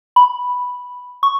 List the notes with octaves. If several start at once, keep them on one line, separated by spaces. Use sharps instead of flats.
B5
C#6